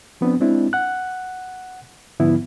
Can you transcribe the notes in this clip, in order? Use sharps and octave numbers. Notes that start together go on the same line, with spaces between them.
F3 B3 C4 D4
G#3 C4 D4 E4
F#5 F#6
G#2 D3 F3 B3 E4